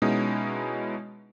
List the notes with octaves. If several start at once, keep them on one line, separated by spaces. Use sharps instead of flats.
B2 G#3 B3 C#4 D#4 E4